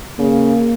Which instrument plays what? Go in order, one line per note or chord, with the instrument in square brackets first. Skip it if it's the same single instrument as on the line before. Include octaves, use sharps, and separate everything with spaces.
[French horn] C#3 [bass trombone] A#3